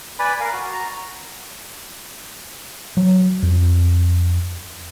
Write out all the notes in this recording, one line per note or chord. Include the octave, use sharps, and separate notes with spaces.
B4 D5 G#5 B5
A#4 F5
F#4
A#5
F#3
F2